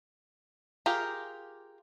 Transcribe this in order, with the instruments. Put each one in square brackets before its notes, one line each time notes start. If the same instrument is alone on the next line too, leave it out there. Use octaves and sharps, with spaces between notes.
[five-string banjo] F4 G4 G#4 A#4